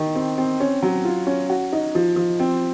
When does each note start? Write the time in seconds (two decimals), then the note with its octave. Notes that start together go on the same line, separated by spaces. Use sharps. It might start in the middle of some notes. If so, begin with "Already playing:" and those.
Already playing: D#3
0.15 C4
0.38 C4
0.60 C#4
0.82 F#3
1.05 F4
1.27 C#4
1.49 F#4
1.73 D#4
1.95 F3
2.16 F3
2.40 C4